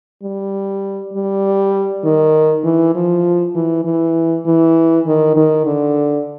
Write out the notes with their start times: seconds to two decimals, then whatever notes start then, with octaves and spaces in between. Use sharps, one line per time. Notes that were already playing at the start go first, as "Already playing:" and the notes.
0.23 G3
1.14 G3
2.04 D#3
2.64 E3
2.96 F3
3.55 E3
3.85 E3
4.46 E3
5.07 D#3
5.36 D#3
5.66 D3